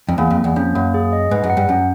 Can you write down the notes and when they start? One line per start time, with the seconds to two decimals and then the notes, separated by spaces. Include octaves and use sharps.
0.09 F2
0.18 E2 A#3
0.30 F2
0.37 A#3
0.44 E2
0.56 F2 C#4
0.75 F#2 A#3
0.94 G#4
1.13 D#5
1.31 G#2 B4
1.44 F#2
1.50 F#5
1.57 G2
1.69 F#2 C#4